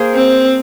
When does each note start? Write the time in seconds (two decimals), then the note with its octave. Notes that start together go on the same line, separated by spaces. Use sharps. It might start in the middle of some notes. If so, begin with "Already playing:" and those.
Already playing: A#3 G#4 C5
0.13 C4